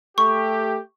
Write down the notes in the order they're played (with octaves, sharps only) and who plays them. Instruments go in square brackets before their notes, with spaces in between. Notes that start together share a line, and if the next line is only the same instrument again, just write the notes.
[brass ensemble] A3 G4 [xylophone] C#6